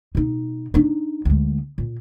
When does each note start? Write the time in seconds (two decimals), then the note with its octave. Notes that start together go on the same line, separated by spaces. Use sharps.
0.15 B2 D#4
0.74 D4 D#4
1.25 D2 G#3
1.78 A#2